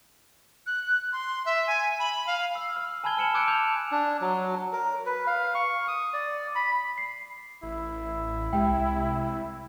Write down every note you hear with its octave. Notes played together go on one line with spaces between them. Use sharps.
F#6
C6
E5
G#5
B5
F5
E6
F6
G#5 A5 B5 F6 G#6 G7
G#5 F6 C#7 E7 F#7
D6 E6 F#6 G#6 C#7 D7
A5 D6 F6 G6 F7
D4
F#3
A#4
B4
F5
C#6
D#6
D5
B5
C7
A1 E4
C2 G#3 G4 G5